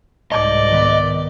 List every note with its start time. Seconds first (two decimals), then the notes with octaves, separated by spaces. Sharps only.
0.32 C2 G#2 D5 D#5
0.71 D#3 B3